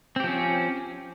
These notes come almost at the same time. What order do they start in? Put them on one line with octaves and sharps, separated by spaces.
C4 G4 F3 C#4